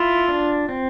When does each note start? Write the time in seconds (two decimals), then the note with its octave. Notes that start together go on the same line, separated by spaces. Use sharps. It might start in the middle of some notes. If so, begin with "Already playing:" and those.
Already playing: E4 F4
0.28 D4
0.69 C4